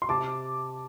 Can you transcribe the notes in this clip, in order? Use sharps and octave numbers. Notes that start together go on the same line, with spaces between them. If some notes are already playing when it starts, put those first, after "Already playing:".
C6
C3 A5 D6